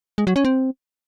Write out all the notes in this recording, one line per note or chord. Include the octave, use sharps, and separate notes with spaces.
G#3
F#3
C#4
C4